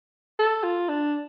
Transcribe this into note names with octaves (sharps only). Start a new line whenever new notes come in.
A4
F4
D4